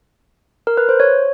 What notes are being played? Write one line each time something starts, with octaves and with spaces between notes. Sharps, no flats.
A#4
B4
C5
C#5